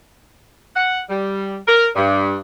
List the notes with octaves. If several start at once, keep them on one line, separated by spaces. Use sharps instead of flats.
F#5
G3
A#4
G2